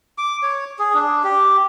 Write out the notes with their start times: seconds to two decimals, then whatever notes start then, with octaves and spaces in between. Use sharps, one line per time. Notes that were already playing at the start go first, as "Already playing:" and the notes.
0.18 D6
0.43 C#5
0.79 G#4
0.94 D4
1.24 G4